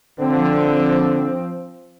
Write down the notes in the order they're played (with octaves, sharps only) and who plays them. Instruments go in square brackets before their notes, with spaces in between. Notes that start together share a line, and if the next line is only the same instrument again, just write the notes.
[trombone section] D3 [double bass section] F3 C4